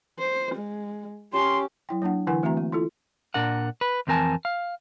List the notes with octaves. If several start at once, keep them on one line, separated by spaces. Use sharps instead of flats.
C5
G#3
C#4 G4 C6
F#3 E4 G5
F#3 A#3 D4 F#5
D3 E3 E4 B4 F#5 G#5
E3 A3 C4 F#4 E5 A#5
A#3
E4 F4 A4
A#2 D4 A#4 F#5
B4
F2 E3 C4 A#4 G#5 A5
F5